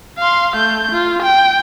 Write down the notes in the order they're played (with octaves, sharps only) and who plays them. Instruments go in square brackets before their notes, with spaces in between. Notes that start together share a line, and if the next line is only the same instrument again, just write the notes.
[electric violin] F5 C6
A3 G6
F4
G5